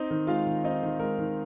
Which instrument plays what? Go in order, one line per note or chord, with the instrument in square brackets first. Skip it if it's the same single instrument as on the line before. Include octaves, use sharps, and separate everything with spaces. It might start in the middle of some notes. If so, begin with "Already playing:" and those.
Already playing: [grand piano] C4 D#4 D#5
D#3
G#3 F4 F5
D#3
C4 D#4 D#5
D#3
G#3 A#4
D#3